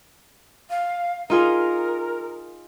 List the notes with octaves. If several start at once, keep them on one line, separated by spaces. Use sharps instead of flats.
F5
D#4 F4 G#4 A#4